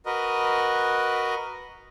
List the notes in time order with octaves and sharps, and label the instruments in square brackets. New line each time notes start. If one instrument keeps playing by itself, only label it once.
[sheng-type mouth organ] F#4 A#4 B4 D#5